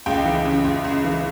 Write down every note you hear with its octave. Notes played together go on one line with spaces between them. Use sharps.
C#2 G5
E3
C#3
C#2
C#2
E3